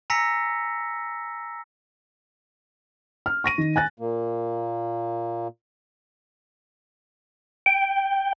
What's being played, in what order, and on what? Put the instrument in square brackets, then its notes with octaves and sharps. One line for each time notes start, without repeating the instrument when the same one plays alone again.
[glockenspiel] G#5 A#5 E6 A#6 B6 C#7
[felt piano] F6
C#6 A#6 D#7
D#3
G#5 F#6 A6
[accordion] A#2 A#3
[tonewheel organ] G5